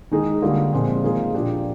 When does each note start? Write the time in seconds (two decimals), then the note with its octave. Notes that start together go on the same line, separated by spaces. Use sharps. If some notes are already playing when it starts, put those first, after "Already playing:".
0.11 D#3 G#3 D#4 G#4
0.42 D3 G3 A#3 F4
0.73 A#2 F3 G#3 C4
1.03 D#3 A#3 F4 G#4
1.34 A#2 F3 A#3 D4 G4